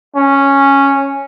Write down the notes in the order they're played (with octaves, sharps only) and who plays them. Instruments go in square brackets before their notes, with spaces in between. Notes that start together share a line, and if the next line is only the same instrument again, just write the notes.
[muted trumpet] C#4